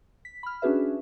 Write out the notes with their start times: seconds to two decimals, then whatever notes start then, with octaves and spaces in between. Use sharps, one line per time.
0.25 B6
0.43 B5 F6
0.62 C#4 D4 F#4 G#4 B4 E5